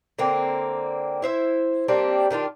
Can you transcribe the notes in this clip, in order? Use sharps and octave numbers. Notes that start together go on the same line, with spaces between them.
D3 A#3 C4
E4 C5 E5
G3 A#3 C4 D4
D#3 D4 E4 F4